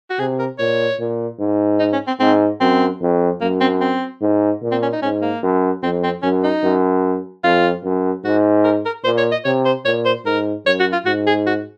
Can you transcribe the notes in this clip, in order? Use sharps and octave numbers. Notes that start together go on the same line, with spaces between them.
F#4
C3 G#4
A#4
A#2 C#5
A#2
G#2
D#4
C#4
C4
G#2 C4
F#2 C4
F2
F#2 A#3
C4
C4
G#2
A#2
C4
C#4
D#4
G#2 C#4
A#3
F#2
F2 C4
C4
F#2 C#4
D#4
F#2
F2 F4
F#2
G#2 F#4
A#4
A#4
A#2 C5
C#5
D#5
C3 C#5
C5
A#2 C#5
C5
G#2 A#4
F#2 C#5
F#4
F4
G#2 F#4
G#4
F#4